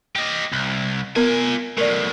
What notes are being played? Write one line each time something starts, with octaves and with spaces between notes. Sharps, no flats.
G4 D#5
C2
B3 F4 A#4 G#5
B1 A2 A#4 D5